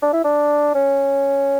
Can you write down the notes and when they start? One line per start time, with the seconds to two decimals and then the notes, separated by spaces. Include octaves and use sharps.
0.02 D4
0.13 E4
0.24 D4
0.75 C#4